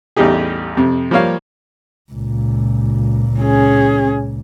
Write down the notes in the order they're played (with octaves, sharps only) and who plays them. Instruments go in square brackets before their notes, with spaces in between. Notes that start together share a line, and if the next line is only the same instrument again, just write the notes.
[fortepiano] A1 E2 G3 D#4 G4 G#4
F2 C3
F3 G3 A#3 C#5 F5
[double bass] C#2 A#2
[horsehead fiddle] C#4 G#4